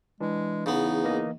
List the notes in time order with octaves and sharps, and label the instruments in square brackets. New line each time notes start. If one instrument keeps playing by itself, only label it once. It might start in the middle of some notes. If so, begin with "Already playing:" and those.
[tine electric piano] E3 D4 [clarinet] G#3
[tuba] E2 [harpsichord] C#3 B3 [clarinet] D#4
[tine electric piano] E3 A#3 D#5